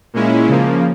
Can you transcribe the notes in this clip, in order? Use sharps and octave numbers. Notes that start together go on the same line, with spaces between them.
A#2 G#3 C#4 E4
C#3 F3 A#3